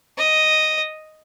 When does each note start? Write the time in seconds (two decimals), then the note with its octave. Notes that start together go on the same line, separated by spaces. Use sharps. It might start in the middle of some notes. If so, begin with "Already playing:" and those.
0.18 D#5